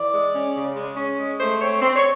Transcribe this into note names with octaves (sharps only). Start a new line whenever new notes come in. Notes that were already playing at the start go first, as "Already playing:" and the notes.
Already playing: E3 D5
G#3
C#4
C#3
G#3
C#4
G#3
A3 C5
C4 C#5
C4
C#5